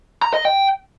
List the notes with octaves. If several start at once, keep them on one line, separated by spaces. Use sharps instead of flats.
A#5
D#5
G5